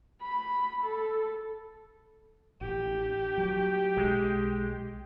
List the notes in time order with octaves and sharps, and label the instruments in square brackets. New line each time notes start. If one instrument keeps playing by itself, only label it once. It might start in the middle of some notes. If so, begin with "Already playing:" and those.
[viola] B5
A4
[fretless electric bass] A1 [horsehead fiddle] G4
[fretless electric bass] F#3
[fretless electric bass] B1 [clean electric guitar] G#3